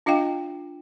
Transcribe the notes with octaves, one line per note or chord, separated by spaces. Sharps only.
D4 F4 D#5 F5 G5